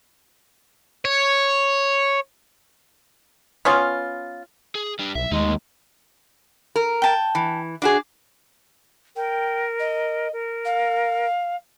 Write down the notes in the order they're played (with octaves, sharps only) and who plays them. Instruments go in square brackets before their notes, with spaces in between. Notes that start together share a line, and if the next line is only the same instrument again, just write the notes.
[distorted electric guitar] C#5
[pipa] B3 C#4 F4
[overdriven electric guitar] G#4
G3 D4
[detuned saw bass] B1 [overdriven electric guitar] E5
[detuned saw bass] D#2 [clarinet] G#3 [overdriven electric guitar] A3 D#4
[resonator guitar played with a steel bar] A#4
[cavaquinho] G5 A5
[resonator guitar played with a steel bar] E3
[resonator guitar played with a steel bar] D4 F#4 G#4 [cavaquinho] D6
[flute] A#4 [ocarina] G5
[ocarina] D#5
[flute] A#4
[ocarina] F5